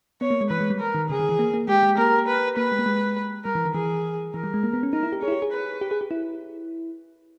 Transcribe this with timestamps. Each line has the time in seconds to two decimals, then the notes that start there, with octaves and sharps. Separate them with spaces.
0.21 B3 C#5
0.30 A#3
0.41 G#3
0.50 E3 B4
0.60 G#3
0.70 G3
0.80 A#4
0.95 D#3
1.09 C#3 G#4
1.19 D#3
1.29 E3
1.39 A#3
1.54 A#3
1.68 G#3 G4
1.83 G#3
1.98 A#3 A#4
2.27 B4
2.57 A#3 B4
2.72 G#3
2.79 A#3
2.86 G#3
3.45 G3 A#4
3.55 E3
3.65 D#3
3.74 E3 G#4
4.34 E3 A#4
4.43 G3
4.54 G#3
4.63 A#3
4.73 B3
4.83 C#4
4.93 D#4 A#4
5.03 E4
5.12 G4
5.22 G#4 C#5
5.28 E4
5.32 G4
5.42 G#4
5.52 B4
5.81 G4
5.91 G#4
6.01 G4
6.11 E4